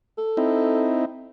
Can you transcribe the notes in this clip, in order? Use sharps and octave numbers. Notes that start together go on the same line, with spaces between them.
A4
C4 D#4 E4